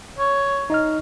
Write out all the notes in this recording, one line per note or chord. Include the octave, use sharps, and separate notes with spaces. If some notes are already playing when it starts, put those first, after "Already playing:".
C#5
D#4 D#5 F6